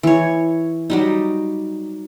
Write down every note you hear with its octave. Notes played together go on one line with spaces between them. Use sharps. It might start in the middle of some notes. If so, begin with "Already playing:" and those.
E3 C#5
F#3 G3 D#4